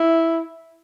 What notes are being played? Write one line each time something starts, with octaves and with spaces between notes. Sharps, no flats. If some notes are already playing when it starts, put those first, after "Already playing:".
Already playing: E4